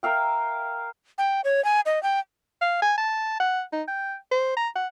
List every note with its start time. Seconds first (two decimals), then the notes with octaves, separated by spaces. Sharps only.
0.03 A#4 E5 F5 G5
1.18 G5
1.44 C#5
1.65 G#5
1.86 D#5
2.03 G5
2.61 F5
2.82 G#5
2.98 A5
3.40 F#5
3.73 D#4
3.88 G5
4.31 C5
4.57 A#5
4.76 F#5